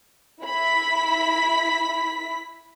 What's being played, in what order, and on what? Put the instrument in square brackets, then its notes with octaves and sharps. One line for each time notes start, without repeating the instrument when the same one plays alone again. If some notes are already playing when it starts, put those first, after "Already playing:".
[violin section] E4 B5 B6